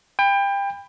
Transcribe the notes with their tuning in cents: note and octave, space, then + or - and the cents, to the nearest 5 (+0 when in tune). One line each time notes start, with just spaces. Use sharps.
G5 +30 B5 +15